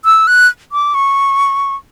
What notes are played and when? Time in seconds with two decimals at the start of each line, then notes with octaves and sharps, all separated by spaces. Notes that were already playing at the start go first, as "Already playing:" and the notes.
0.05 E6
0.27 F#6
0.72 D6
0.94 C#6